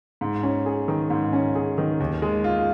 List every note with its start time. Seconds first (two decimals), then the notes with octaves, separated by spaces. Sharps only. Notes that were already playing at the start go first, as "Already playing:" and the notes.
0.21 G#2
0.43 C#4
0.66 G#4
0.88 D#3
1.10 G#2
1.33 C#4
1.55 G#4
1.78 D#3
2.00 D#2
2.22 G#3
2.44 F4